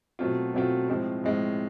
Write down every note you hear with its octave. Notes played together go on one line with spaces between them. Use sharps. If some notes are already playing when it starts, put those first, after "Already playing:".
B2 F#3 A3 C4 F4
B2 F#3 A3 C4 F4
A2 F3 G#3 C4 F4
A2 F3 G#3 C4 F4